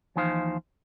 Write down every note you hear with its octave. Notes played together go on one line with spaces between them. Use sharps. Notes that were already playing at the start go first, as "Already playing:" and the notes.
D#2 E3 F3 D#4 C5 F5